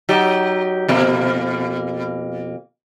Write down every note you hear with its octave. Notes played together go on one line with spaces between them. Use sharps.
F#3 D#4 G4
F2 B2 A#3